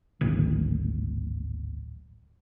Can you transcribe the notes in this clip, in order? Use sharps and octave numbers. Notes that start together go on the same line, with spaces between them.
D1 G#1